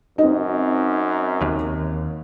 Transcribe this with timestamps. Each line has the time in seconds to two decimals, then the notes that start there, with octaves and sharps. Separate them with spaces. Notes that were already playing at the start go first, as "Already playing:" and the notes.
0.18 F#2 C4 D#4 D#5
1.42 D#2